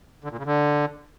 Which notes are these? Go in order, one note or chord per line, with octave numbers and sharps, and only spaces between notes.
D3
A#2
C#3
D3